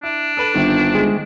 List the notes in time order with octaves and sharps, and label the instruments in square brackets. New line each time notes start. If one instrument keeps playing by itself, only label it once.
[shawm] D4 [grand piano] E4
[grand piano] A4 B4 F#7
[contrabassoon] G1 [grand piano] D#3 C4 E4
[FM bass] G#3